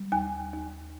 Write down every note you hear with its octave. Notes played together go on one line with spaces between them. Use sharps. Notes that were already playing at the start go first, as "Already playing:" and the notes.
Already playing: G3
D#2 G#5
D#2